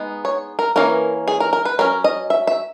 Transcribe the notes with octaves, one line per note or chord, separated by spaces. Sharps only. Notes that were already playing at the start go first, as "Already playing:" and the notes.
Already playing: G#3 B3 D#4
C#5
A#4
E3 A#3 C#4 A#4
G#4
A#4
A#4
B4
F#3 C#4 A#4
D#5
E5
E5